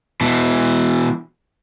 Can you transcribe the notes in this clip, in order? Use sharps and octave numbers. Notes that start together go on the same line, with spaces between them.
B2 E3